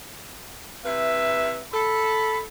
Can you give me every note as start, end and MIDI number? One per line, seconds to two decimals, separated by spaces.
0.86 1.60 48
0.86 1.60 64
0.86 1.60 71
0.86 1.64 76
1.74 2.42 69
1.74 2.43 83